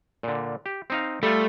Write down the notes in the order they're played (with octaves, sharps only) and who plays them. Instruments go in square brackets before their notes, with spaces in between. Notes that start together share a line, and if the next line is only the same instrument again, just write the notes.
[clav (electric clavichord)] A#2 D3
G4
C4 D#4 F5
[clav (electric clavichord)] G3 F4 [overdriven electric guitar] A3